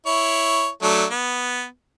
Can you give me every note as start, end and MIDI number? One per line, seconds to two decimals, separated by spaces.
0.07 0.68 64
0.07 0.68 73
0.82 1.05 54
0.82 1.05 57
0.82 1.05 62
1.11 1.65 59